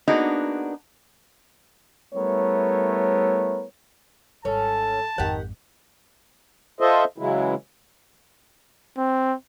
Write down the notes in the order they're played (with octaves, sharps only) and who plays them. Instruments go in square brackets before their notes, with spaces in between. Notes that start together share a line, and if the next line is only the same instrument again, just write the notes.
[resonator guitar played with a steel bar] A#3 B3 D4 D#4 F#4 G#4
[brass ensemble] G3 A3 B3 E4 A#4 C#5
[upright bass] G#1 G3 [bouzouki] C#4 [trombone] A4 [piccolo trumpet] A5
[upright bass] G#1 F2 [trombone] D#3 [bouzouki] G4 F#5
[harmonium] F4 A4 C5 D#5 E5
C#3 E3 F#3 G#3 E4
[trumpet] C4